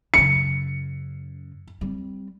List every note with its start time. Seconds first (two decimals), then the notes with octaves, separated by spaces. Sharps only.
0.14 F#2 C#3 C#7
1.81 G3 C4